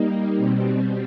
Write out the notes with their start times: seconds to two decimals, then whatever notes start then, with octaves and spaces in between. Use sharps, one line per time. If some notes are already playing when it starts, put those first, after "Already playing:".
Already playing: G3 A#3 D#4
0.35 B2 G3 C4